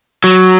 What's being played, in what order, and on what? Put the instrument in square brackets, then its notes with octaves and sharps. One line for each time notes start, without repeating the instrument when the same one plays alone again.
[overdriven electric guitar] F#3